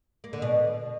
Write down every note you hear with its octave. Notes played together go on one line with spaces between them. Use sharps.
A#3
D3
B2